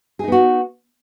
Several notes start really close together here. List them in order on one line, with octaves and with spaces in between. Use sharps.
G#4 D#4 B3 F#4